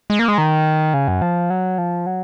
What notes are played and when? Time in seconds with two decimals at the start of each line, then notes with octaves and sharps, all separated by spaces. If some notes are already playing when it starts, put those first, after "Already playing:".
0.10 G#3
0.19 A#3
0.28 G#3
0.38 D#3
0.94 C#3
1.08 F#2
1.22 F3
1.50 F#3
1.78 F3
2.06 F#3